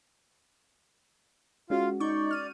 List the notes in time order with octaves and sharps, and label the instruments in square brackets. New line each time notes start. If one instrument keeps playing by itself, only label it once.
[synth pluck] G#3 C#4 F#4 [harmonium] F4 F5
[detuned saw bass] D#4 [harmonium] D5 [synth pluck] C#6 G6
[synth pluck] F6 D#7